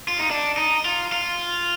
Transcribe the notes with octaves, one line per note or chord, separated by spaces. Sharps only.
F4
D#4
D4
D#4
F4
F4